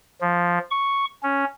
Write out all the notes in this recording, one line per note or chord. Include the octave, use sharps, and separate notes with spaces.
F3
C#6
C#4